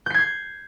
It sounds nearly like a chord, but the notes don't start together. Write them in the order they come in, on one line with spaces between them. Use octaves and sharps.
G6 C7 G#6